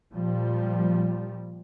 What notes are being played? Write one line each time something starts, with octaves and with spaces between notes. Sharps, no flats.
A#2 F3 G3